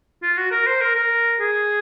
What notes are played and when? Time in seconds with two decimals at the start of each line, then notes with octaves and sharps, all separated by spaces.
0.23 F4
0.37 F#4
0.51 A#4
0.67 C5
0.81 A#4
0.95 A#4
1.40 G#4